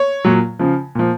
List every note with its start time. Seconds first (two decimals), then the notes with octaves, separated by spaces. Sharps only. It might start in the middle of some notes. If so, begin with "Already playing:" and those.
Already playing: C#5
0.25 A#2 F#3
0.59 C#3 F3
0.95 A#2 F3